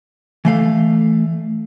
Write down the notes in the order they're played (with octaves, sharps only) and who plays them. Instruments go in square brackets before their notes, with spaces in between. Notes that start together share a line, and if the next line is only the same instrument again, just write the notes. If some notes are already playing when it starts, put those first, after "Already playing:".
[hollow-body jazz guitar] E3 A3 F5